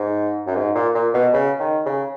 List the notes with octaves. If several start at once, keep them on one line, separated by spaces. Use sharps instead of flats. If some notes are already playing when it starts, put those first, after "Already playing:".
Already playing: G#2
F#2
G#2
A#2
A#2
B2
C#3
D#3
C#3